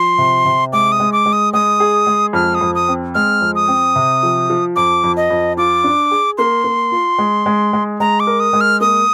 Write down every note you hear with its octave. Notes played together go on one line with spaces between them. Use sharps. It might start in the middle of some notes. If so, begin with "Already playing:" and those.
Already playing: F3 C6
C3
C3
G#3 D6
D#6
G#3
D6
G#3
D#6
G#3 D#6
G#4
G#3
F2 F6
D#6
F2
D#6
C4
G#3 F6
F2
D#6
C4
C3
F3
F3
F2 D6
F2
D#5
F2
F4 D6
D4
G#4
A#3 C6
A#3
F4
G#3
G#3
G#3
G#3 A#5
D6
A#4
D#6
G#3
F6
A#3 D#6